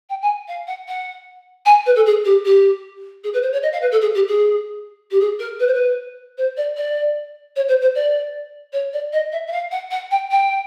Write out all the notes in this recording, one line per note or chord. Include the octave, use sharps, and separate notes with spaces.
G5
G#5
F5
F#5
F#5
G#5
B4
A4
G#4
G4
G4
G#4
B4
C5
C#5
D#5
F5
B4
A4
G#4
G4
G#4
G4
G#4
A#4
B4
C5
B4
C5
D5
D5
C#5
C5
C5
D5
C#5
D5
D#5
E5
E5
F5
F#5
F#5
G5
G5